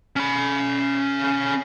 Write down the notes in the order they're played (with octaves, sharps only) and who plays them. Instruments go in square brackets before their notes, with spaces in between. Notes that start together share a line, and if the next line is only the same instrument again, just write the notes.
[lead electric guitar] C#4 B5